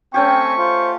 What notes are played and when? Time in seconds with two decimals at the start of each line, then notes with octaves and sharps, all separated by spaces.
0.14 A3 C4 C#4 G4 G5 G#5 C#6
0.58 F4 C5